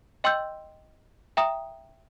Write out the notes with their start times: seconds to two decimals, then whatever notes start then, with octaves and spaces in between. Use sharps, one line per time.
0.24 D#5 G5 C6 E6 G6
1.37 E5 G5 A#5 D#6